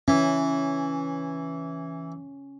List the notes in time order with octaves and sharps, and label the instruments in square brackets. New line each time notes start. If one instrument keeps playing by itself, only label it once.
[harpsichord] E3 [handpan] C#4